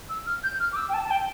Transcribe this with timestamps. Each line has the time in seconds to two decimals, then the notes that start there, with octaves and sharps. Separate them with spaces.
0.09 E6
0.26 F6
0.43 G6
0.60 F6
0.72 D6
0.76 E6
0.89 G5
0.94 A5
1.05 A5
1.11 G5